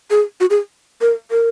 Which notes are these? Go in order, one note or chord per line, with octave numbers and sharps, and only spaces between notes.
G#4
F#4
G#4
A#4
A#4